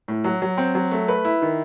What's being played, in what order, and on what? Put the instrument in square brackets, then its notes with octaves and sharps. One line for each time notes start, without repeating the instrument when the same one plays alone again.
[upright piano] A2
F#3
F#3
C4
F#3
A3
B4
E4
D#3